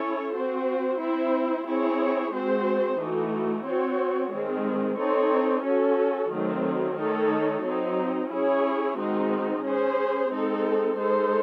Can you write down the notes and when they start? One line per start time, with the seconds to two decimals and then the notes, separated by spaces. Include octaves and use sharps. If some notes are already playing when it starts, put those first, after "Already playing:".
Already playing: C#4 E4 A4 C#5
0.34 C4 F#4 C5
1.00 C4 E4 C5
1.66 C4 E4 G#4 C#5
2.33 G#3 C4 F#4 C5
3.00 E3 A3 D#4 F#4
3.66 C4 F#4 C#5
4.33 D#3 G#3 C4
4.99 C4 D#4 A4 C#5
5.65 C#4 F#4 A4
6.32 D#3 F#3 A3 C4
6.98 D#3 A3 D#4 A4 C#5
7.65 F#3 C4 D#4
8.31 C#4 E4 G#4 C#5
8.97 D#3 G#3 C4 D#4 F#4
9.64 C#4 G#4 C5
10.30 G#3 C4 D#4 A4
10.97 G#3 D#4 A4 C5